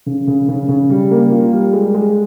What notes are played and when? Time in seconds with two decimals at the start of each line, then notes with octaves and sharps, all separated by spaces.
0.06 C#3
0.27 C#3
0.48 C#3
0.68 C#3
0.90 G3
1.11 A#3
1.31 F4
1.53 G3
1.73 G#3
1.94 G#3